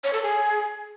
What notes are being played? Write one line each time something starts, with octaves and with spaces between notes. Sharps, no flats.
C#5
A4
G#4